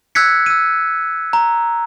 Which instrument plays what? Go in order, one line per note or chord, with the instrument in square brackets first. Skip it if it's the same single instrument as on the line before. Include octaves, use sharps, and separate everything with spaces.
[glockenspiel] E6 F#6 G#6 B6 C#7
E6 D#7
A#5